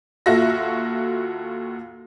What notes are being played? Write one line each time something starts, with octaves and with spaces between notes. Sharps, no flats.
D#2 F4 F#4 A4 E5 A#6